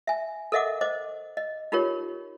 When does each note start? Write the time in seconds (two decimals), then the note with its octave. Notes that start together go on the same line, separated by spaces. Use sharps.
0.07 E5 G#5
0.52 A4 A#4 D#5 E5 F#5 D6
0.81 C5 D#5 D6
1.37 D#5
1.72 D#4 F4 G4 A#4 C#5